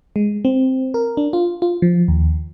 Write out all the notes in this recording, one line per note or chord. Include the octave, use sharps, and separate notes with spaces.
G#3
C4
A#4
D4
F4
F4
F3
D#2